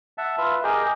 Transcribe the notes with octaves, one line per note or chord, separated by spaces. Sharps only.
E5 F#5 A5
F4 B4 E5
G4 G#4 A#4 D#5 G5